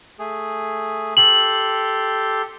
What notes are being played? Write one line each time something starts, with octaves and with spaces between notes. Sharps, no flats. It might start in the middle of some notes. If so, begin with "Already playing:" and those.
A3 G#4
G4 A4 C6 F#7